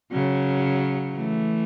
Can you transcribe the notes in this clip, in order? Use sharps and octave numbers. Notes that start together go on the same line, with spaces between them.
C#3 F#3
E3 A3